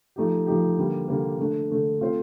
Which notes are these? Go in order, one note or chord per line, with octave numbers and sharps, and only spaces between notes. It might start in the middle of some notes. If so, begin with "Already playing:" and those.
F3 A3 D#4 G4
F3 A3 D#4 G4
D3 G3 A#3
D3 G3 A#3
D3 A3 D4
D3 A3 D4
A3 C4 F4 C5